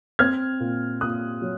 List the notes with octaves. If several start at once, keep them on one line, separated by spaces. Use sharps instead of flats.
C4 F6 G#6
A#2
A#2 D#6 F#6
F#3